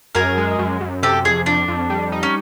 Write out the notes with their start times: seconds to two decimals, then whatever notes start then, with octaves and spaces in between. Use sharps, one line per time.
0.15 F#2 G#4 A#4
0.38 G#3
0.59 F#2
0.80 F#2
1.03 C3 G4 A4
1.25 F2 G#4
1.46 F2 D4
1.68 F2
1.90 G3
2.12 D#4
2.23 C#4